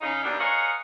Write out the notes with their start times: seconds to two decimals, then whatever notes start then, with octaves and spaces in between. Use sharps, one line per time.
0.01 C#3 D#4
0.23 D#2 B2 G3 D4
0.39 G#4 A#4 C#5 D#5 F5 F#5